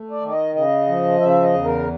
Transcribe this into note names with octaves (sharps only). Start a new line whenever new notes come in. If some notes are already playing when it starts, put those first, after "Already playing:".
Already playing: A3
D5
D#3
D5
D#5
C#3 D#5
F3
C#3 E5
D#5
E2
A#4